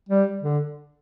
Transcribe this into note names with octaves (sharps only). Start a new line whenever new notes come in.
G3
D3